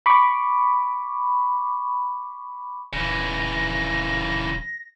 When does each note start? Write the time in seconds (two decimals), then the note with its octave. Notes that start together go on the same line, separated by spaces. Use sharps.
0.06 B5 C#6 D6
2.93 D#1 C#3 E3 A#6